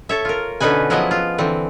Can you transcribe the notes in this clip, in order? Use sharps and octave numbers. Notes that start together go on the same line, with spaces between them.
A4 C#5 E5
F4 A#4
B2 D3 C#4 D#4 B4 G#5
F3 F#3 B3 E4 G#4 D#5
F4
D3 E3 C4